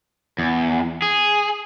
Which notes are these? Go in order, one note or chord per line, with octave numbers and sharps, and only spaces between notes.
E2
G#4